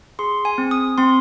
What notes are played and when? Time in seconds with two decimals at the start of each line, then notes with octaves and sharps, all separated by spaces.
0.19 G#4 C6
0.45 G#5
0.58 C4
0.71 D#6
0.98 C4 C6